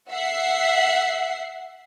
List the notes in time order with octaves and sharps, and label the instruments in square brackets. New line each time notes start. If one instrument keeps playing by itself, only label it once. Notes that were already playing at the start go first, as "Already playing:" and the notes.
[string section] E5 F#5 C7